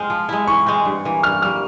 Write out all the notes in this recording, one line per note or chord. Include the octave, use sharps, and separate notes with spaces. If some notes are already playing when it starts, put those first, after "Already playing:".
Already playing: G#3 C4 F6
F3
G#3 E4
E3 C#6
G#3 C4
G2
E3 A#3
G2 F6
G3 A#3 F6